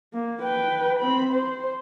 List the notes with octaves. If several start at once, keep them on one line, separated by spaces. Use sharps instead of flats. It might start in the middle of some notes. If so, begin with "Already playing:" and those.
A#3
B4 G5
C4 B5
C5